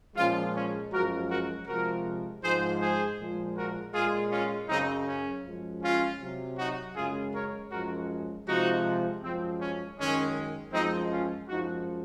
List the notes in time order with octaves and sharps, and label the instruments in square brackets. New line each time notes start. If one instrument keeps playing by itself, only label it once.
[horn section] A#2 F3 G#3 C#4 F4
C#4
F#2 F3 G#3 F#4 A#4
F#4 A#4
C3 F3 G#3 F#4 A#4
G#2 F3 G#3 G#4 C5
G#4 C5
A#2 F3 G#3
F#4 A#4
A#2 G#3 F4 G#4
C#4 F4
F#2 C#3 F#3 C4 D#4
C#4
F#2 F3 G#3
C#4 F4
C3 F#3
D#4 F#4
F#2 C#3 G#3 F4 G#4
A#4 C#5
F#2 F3 G#3 F#4 A#4
C3 F3 G#3 D#4 F#4
F#2 F3 G#3 C4
C#4
F#2 D#3 G#3 C#4
F#2 F3 G#3 C4 D#4
C#4 F4
F#2 F3 G#3 D#4 F#4